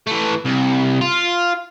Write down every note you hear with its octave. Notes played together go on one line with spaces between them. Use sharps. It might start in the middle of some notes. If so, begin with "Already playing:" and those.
E3 A3
C2
F4